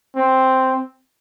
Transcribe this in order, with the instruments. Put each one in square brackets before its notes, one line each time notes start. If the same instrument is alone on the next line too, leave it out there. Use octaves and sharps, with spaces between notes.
[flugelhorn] C4